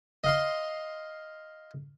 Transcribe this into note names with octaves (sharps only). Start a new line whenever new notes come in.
D#5 F5 C6